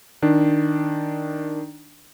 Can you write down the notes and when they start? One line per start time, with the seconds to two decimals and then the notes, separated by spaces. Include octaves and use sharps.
0.22 D#3 D4